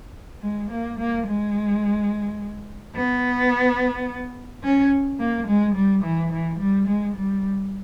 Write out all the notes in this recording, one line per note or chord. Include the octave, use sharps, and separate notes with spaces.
G#3
A#3
A#3
G#3
B3
C#4
A#3
G#3
G3
E3
E3
G3
G#3
G3